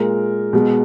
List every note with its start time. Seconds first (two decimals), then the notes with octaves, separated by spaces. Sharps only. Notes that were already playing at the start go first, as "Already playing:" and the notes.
Already playing: A#2 G#3 A#4
0.53 B2 G#3